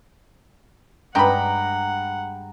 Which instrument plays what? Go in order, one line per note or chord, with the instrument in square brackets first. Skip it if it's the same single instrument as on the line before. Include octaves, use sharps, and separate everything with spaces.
[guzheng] G2 G#3 [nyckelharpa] F#5 [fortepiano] G5 B5 [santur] A#5